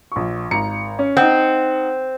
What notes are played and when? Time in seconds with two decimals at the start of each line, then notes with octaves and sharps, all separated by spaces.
0.12 A#1 C#6
0.51 G#1 A#5 C#7
0.99 C#4
1.17 C4 D#4 F#5